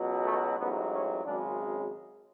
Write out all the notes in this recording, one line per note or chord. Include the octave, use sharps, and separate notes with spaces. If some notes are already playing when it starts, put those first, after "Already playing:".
Already playing: C#2 B2 F#3
A3
A1 G#2 F#3 B3
C#4
G#1 F#2 C#3 G#3 D4